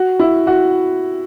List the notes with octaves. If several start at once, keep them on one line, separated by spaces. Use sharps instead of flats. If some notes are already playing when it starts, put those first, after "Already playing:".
Already playing: F#4
E4
F#4